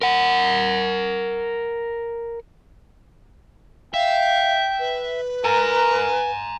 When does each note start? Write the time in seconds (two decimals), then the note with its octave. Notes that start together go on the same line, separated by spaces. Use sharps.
0.02 A#4 F#5
3.94 E5 F5 G5
4.79 B4
5.44 A#4 G#5 A#5